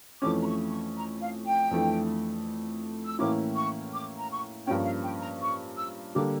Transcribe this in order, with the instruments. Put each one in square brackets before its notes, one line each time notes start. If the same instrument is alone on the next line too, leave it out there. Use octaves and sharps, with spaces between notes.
[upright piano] F2 E3 A3 C#4 [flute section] D6
[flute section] A#5
C#6
C#6
A#5
F5
G5
[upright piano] F2 E3 A3 D4
[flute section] E6
[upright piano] A2 E3 A#3 C#4 E4 [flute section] D6
[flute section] C#6
D6
A#5
C#6
[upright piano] G2 F3 A#3 C#4 [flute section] G5
[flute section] F5
G5
A#5
C#6
E6
[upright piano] D3 G3 A#3 D4 [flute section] D6